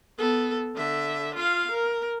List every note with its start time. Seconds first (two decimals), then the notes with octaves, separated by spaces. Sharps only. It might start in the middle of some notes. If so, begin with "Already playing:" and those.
0.18 B3 A4
0.75 D3 E5
1.35 F4 F5
1.71 A#4